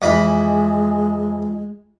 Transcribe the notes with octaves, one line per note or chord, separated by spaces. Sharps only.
F2 E3 G#3 B5